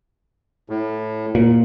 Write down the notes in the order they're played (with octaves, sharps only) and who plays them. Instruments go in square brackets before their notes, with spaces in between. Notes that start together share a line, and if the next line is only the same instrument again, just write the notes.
[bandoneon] A2
[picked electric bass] A#2